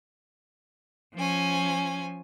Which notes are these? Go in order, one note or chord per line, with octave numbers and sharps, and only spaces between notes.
F3 C#4 G#5